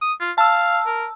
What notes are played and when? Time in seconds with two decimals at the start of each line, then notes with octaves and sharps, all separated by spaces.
0.01 D#6
0.21 F4
0.38 F5 A5 E6
0.86 A#4